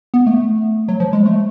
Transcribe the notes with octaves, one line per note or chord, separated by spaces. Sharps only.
B3
A3
F#3
F3
G#3
A3